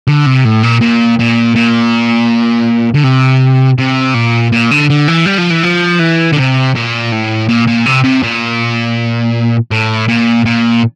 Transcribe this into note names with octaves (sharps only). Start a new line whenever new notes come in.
D3
C3
A2
A#2
A#2
A#2
A#2
D3
C3
C3
A#2
A#2
D3
D3
E3
G3
F3
E3
F3
E3
D3
C3
A#2
A2
A#2
A#2
C3
C3
A#2
A2
A#2
A#2